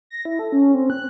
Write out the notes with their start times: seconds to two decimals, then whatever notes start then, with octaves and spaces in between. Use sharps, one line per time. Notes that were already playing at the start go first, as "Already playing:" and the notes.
0.10 A#6
0.25 E4
0.39 A4
0.52 C#4
0.74 C4
0.90 F#6